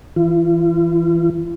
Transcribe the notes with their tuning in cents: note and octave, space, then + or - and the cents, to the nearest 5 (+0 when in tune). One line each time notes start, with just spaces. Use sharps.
E3 +0 F4 -45